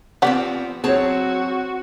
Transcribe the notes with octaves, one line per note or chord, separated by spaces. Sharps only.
F3 B3 C4 G4 D5 F#5
F#3 C4 F#4 G#4 C#5 A5